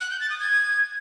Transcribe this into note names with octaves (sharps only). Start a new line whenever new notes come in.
F#6
G6
A6
D#6
G#6